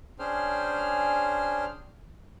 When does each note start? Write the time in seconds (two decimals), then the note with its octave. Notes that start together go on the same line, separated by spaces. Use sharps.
0.19 C#4 D4 G#4 C5 G5 F6